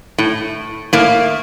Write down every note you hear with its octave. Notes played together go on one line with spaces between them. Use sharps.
A2
A2 A#3